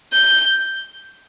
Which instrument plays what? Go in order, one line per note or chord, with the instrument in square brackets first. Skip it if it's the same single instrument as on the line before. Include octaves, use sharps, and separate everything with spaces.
[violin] G6